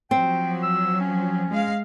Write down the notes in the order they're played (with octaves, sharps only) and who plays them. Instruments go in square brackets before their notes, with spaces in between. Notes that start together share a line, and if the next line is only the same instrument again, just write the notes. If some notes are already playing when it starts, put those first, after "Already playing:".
[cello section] F3 F#3 [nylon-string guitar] C4 [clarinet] G5
[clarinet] E6
C#4
[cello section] G#3 F5